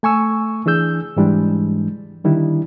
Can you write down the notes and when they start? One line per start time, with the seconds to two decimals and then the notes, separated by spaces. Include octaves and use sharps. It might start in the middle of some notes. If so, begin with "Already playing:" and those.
0.03 A3 G#5 C#6 E6
0.66 E3 D4 G#4 E6 G6
1.17 G#2 E3 G3 G#3 D4
2.24 D3 D#3 G3 D4 E4